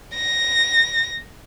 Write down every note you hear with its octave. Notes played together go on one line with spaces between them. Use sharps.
A#6